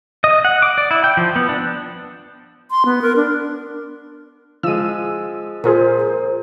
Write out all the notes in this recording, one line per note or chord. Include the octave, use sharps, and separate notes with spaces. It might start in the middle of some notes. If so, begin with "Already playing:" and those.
D#5
F#5
D6
D5
E4
G5
F3
B3
D4
C6
B3
A#4
D4
F3 G#3 E6 D#7
A#2 F4 G#4 A#4 C5